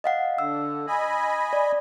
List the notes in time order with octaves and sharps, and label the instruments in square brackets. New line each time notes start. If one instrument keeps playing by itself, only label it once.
[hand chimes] D#5 F5 F#5
[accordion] D3 [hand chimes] E6
[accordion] D#5 G#5 B5
[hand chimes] D5